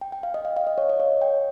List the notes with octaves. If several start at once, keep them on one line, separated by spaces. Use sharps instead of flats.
G5
G5
F5
D#5
F5
F5
D#5
C#5
D#5
C#5
G5